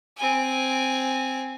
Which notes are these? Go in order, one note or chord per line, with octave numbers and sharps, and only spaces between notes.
C4 G#5